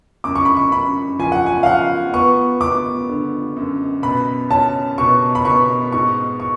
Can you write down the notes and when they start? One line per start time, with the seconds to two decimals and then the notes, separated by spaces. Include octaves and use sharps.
0.24 F#2 D6
0.35 C#6
0.45 B5
0.57 C#6
0.72 F#2 B5
1.19 F3 G#5
1.32 F#5
1.46 G#5
1.63 F5
1.66 F3 F#5
2.14 B3 C#6
2.61 B3 D6
3.09 D3
3.56 F#2
4.03 B2 B5
4.51 C#4 A5
4.98 B2 C#6
5.35 B5
5.45 B2 C#6
5.92 G#2 C#6
6.40 C#6